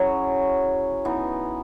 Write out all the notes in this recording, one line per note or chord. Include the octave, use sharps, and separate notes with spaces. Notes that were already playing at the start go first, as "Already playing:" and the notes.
Already playing: F#3 C#4 E4 G#4
E3 B3 D#4